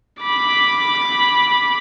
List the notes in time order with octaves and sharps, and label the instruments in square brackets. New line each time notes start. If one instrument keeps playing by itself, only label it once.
[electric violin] B5 D6